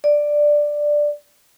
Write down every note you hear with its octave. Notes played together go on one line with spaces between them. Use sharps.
D5